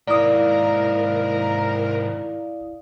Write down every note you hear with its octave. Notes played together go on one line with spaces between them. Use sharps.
G#2 A#3 E4 A#4 D5 F5 D#6